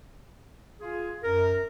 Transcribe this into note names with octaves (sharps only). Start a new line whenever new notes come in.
F4 G#4
F#2 A#4